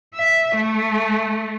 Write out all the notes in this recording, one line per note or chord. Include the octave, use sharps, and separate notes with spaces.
E5
A3